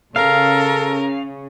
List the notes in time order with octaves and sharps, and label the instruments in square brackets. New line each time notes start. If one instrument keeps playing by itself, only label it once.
[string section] C#3 [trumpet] A4 [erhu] A#4 [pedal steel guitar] F5